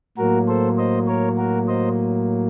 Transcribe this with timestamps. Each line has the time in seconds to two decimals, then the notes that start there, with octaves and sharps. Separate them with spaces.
0.17 A2 F#3 A#3 F#4 A#4
0.48 A4 C5
0.77 C5 D#5
1.07 A#4 C#5
1.37 F#4 A#4
1.68 C5 D#5